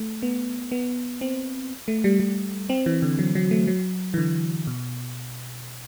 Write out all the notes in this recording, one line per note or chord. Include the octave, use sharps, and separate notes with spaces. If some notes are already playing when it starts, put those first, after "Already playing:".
Already playing: A3
B3
B3
C4
A3
G3
G3
C4
E3
D3
F#3
F#3
A3
F#3
E3
D3
B2